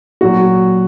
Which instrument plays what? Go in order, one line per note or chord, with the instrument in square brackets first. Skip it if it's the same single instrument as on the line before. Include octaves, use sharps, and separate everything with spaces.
[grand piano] A#2 F#3 F#4